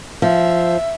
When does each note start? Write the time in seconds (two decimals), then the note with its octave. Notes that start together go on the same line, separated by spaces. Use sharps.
0.22 F3 E5